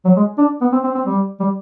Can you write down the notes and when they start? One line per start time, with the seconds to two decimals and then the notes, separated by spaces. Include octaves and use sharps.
0.05 F#3
0.16 G#3
0.38 D4
0.61 B3
0.72 C4
0.84 C4
0.95 C4
1.06 G3
1.40 G3